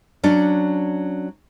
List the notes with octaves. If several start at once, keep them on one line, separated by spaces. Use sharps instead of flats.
F#3 C#4 D4